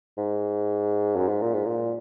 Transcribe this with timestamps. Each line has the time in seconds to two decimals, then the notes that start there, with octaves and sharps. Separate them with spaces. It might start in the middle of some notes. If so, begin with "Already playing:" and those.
0.18 G#2
1.16 F#2
1.29 G#2
1.42 A#2
1.54 G#2
1.66 A#2